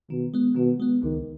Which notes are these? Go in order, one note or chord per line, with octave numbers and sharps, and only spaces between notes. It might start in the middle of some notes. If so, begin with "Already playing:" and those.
B2 D#3
G#3 B3
B2 D#3
G#3 B3
C#2 D#3